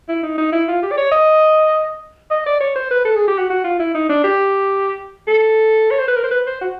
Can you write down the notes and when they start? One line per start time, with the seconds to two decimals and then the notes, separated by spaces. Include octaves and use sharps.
0.09 E4
0.23 D#4
0.38 D#4
0.52 E4
0.68 F4
0.83 G4
0.91 D5
0.97 C#5
1.12 D#5
2.31 D#5
2.46 D5
2.61 C#5
2.76 C5
2.91 B4
3.05 A4
3.16 G#4
3.28 G4
3.38 F#4
3.50 F#4
3.64 F4
3.80 E4
3.94 D#4
4.09 D4
4.24 G4
5.28 A4
5.91 C#5
5.99 C5
6.08 B4
6.16 A#4
6.24 C5
6.31 B4
6.47 C5
6.61 F#4